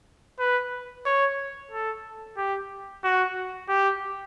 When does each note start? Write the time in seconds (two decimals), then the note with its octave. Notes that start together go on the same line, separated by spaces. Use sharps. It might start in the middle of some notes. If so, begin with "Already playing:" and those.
0.39 B4
1.06 C#5
1.71 A4
2.37 G4
3.04 F#4
3.69 G4